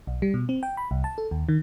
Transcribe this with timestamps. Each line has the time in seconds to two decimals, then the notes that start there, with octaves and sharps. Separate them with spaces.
0.07 B1
0.22 G3
0.34 B2
0.49 C4
0.63 G5
0.77 B5
0.91 C2
1.04 A5
1.18 A4
1.31 D#2
1.49 D#3